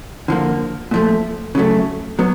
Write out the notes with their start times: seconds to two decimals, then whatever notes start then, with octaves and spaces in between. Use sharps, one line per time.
0.28 D3 F3 A#3
0.91 A#2 F3 A3
1.55 C#3 F#3 A3
2.19 F#3 B3